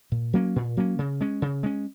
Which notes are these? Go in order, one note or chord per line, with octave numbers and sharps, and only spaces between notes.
A#2
F#3 A#3 C#4
A#2
F#3 A#3 C#4
C#3
G#3 C#4
C#3
G#3 C#4